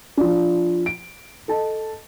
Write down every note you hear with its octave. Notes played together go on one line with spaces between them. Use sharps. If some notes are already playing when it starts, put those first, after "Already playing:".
F3 D4
D7
A4 D#5 A5